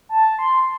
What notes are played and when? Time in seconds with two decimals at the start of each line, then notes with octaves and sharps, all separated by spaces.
0.09 A5
0.39 C6